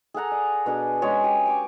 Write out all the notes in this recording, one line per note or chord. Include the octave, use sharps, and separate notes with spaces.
G#4 A4 F#5 A#5
D5
B2 D4 G#4
G#3 C#4 G#4 C#5
G4
G#5 C#6 D6